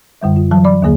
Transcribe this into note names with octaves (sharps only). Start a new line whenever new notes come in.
F#2 D3 G3 E5
F4
E3 F#3 A5
D5 B5 D6
D#2 D3 A#3 G#4